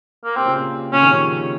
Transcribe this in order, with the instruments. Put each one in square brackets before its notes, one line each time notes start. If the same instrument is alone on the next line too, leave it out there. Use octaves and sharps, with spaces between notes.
[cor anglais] A#3
[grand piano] C3 [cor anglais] C4
[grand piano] A#2 C#3
C3
[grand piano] A#2 C#3 [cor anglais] C#4
[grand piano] C3 D#3
C#3 F3